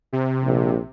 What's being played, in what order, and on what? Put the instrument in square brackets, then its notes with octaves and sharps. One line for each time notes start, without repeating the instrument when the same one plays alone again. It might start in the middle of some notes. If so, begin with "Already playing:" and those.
[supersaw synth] C3
[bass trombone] A#1